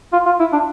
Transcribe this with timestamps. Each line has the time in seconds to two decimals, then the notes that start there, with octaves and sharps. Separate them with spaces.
0.13 F4
0.26 F4
0.40 E4
0.53 D4